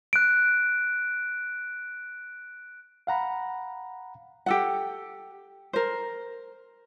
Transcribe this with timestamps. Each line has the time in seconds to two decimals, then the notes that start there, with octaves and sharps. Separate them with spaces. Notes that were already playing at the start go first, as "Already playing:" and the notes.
0.13 F#6 D7
3.07 F5 F#5 A#5 B5
4.46 G4 A4 F#5
5.73 A#4 C5